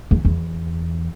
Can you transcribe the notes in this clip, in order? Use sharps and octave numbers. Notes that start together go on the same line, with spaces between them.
E2
E2